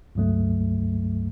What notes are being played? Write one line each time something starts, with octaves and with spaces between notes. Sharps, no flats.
C#2 G2 F#3 A3